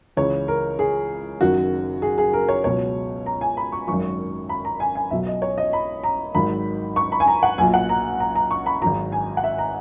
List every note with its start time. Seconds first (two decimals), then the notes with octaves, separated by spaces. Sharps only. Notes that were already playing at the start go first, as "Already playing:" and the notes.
0.17 C#2 C#3 E3 C#5
0.48 A#4
0.79 G#4
1.41 F#1 F#2 D#3 F#3 F#4
2.02 G#4
2.18 G#4
2.33 A#4
2.49 C#5
2.64 C#2 B2 F#3 C#5
3.26 A#5
3.41 G#5
3.57 B5
3.72 C#6
3.87 G#1 F#2 D#3 F#3 C#6
4.49 B5
4.65 A#5
4.80 G#5
4.95 G#5
5.11 B1 B2 F#3 E5
5.27 D#5
5.42 C#5
5.58 D#5
5.73 B5
6.04 A#5
6.35 G#1 G#2 D#3 F#3 B5
6.96 C#6
7.12 B5
7.20 G#5
7.28 A#5
7.43 F#5
7.58 B1 A#2 F#3 G#5
7.74 F#5
7.89 A#5
8.20 A#5
8.35 A#5
8.51 C#6
8.66 B5
8.82 G#1 G#2 F#3 A#5
9.12 G#5
9.37 F#5
9.44 E5
9.58 A#5